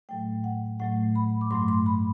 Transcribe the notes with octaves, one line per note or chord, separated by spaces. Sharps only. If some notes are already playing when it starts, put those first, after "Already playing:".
A2 F#3 A3 G5
F#5
A2 F#3 A3 F#5
B5
D6
G2 F#3 A3 C6
C6
B5